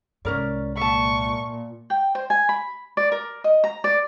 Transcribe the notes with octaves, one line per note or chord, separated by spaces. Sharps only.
C2 G#2 C#4 A#4 D5
A#2 E5 A5 C#6
G5
C5
G#5
B5
D5
A#4
D#5
A#5
D5